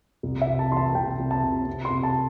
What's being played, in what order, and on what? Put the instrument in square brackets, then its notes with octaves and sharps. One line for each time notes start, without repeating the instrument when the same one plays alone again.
[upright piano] C2
E5
C3
A5
E3 C6
A5
C2 G5
C2
A5
C3
C4
C6
C3
A5